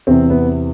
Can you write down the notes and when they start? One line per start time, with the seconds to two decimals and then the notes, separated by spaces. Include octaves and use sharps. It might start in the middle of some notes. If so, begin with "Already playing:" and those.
0.07 E2 C3 E3 C4
0.30 B3